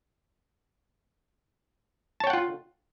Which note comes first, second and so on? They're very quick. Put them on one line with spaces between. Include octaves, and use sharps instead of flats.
A5 C#5 G5 F#5 F4